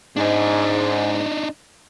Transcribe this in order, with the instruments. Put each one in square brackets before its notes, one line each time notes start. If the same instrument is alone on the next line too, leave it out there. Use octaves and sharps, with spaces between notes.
[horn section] G#2 [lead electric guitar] D4 D#4